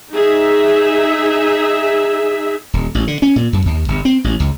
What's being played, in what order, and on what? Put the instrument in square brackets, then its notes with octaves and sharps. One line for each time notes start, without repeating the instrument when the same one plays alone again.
[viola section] D#4 G#4 E5
[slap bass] D#1
A1
D3
C#4
A#2
F#2
D#2
G1
C4
A1
C#2